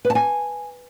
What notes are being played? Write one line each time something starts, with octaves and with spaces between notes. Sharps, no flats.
B4
A5
G#5